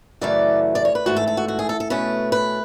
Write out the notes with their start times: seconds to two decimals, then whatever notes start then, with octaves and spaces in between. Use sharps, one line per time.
0.21 F#2 C#3 E3 A3 D5
0.75 D5
0.85 C#5
0.95 B4
1.06 G#2 E3 A3 F#4
1.17 A4
1.28 A4
1.37 F#4
1.48 F#4
1.59 G#4
1.69 A4
1.80 A4
1.90 B2 A3 C#4 B4
2.32 B4